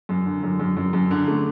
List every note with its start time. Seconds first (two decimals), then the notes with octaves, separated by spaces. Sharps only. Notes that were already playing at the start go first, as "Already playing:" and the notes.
0.09 F#2
0.26 D3
0.43 F#2
0.60 F#2
0.77 F#2
0.93 F#2
1.11 D3
1.28 A3